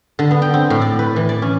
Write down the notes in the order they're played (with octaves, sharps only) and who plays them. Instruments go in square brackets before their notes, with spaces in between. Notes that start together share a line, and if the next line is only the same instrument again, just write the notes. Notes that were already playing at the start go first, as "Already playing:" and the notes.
[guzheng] D3
B3
G5
C4
A2
D5
B4
E3
D5
C#4